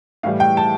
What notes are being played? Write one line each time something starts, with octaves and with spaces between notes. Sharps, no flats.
A2 E3 G3 F5
G5
A5